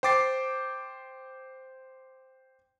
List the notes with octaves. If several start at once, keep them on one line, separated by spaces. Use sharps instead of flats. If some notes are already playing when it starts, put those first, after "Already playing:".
C5 G5 D6 A6 C7